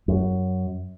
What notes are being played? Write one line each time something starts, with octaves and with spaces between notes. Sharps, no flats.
F#2